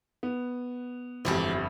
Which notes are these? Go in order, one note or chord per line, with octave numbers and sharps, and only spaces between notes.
B3
G1 F2 E3 F#3 G#3 G4